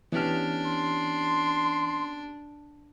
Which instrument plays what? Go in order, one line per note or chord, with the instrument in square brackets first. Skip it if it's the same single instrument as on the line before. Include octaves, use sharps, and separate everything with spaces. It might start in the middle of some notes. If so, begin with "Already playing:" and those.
[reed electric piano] E3 F6 [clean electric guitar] B3 C#4 G4 [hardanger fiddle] D4
[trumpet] C6